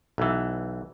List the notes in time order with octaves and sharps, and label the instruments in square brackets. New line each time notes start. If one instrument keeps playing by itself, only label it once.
[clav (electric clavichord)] B1 E3